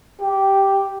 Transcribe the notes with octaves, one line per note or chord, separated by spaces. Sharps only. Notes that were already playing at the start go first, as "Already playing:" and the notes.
G4